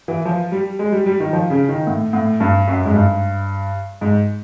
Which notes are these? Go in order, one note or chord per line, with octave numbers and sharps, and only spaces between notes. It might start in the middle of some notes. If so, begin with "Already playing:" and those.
E3
F3
G3
G#3
G3
G3
D#3
F3
C#3
D#3
A2
A2
G2
F#2
G#2
G2
G#2